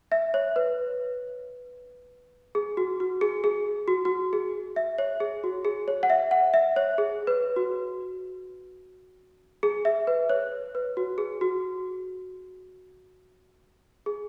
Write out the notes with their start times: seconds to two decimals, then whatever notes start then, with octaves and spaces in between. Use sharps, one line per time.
0.12 E5
0.34 C#5
0.56 B4
2.55 G#4
2.77 F#4
3.00 F#4
3.21 G#4
3.44 G#4
3.88 F#4
4.05 F#4
4.33 G#4
4.76 E5
4.98 C#5
5.20 G#4
5.44 F#4
5.65 G#4
5.88 C#5
6.03 F#5
6.10 E5
6.31 F#5
6.54 E5
6.76 C#5
6.98 G#4
7.27 B4
7.56 F#4
9.63 G#4
9.85 E5
10.07 B4
10.30 C#5
10.75 B4
10.97 F#4
11.18 G#4
11.41 F#4
14.06 G#4